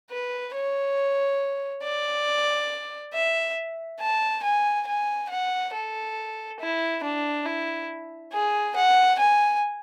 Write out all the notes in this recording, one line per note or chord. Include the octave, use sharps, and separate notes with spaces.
B4
C#5
D5
E5
A5
G#5
G#5
F#5
A4
E4
D4
E4
G#4
F#5
G#5